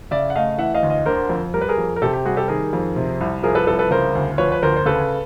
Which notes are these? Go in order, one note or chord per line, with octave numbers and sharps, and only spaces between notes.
C#3 D5 E5
F#5
A3 D#5 F5
E3 E5 F#5
D#5 F5
D2
D#5 F5
D3 A#4 C5
F2
G3 A#4
B4
G#4 A#4
F2
A#4
C3 G4 A4
G4
G3 F#4 G#4
G4 A4
D#3 G#4 A#4
F2
C3
C2
F3 G#4 A#4
A4 B4
C2 A4 B4
A4 B4
C#3 A#4 C5
D2
F3 B4 C#5
B4
D2 A#4 C5
C5
C#3 A4 B4